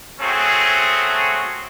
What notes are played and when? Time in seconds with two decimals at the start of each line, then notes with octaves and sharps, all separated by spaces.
0.20 A3 C4 C#4 F#4 G#4